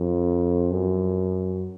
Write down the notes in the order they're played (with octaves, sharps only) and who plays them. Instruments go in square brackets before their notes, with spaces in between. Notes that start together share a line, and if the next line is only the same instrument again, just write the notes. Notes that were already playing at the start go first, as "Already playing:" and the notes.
Already playing: [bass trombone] F2
F#2